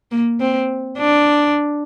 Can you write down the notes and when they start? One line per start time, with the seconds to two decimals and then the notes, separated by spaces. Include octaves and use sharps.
0.11 A#3
0.40 C4
0.98 D4